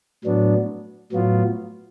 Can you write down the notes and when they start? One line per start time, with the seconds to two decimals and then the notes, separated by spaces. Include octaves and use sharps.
0.25 A2 F#3 B3 D4
1.12 A2 F#3 B3 F4